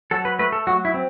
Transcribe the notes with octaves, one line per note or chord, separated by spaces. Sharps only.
F#3 A4
B4
A3 B4
A4
F#3 F#4
E4
C4